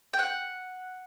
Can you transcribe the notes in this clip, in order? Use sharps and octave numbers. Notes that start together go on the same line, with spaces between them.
G5
F#5